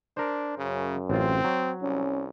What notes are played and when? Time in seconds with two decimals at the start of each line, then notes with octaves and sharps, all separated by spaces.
0.17 D4 A#4 C5
0.58 F#2 C#3
1.10 A1 C4 F4
1.44 F#3
1.83 C2 C#4